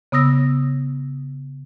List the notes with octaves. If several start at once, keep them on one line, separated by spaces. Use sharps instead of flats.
C#3 B3 D#6 E6 A#6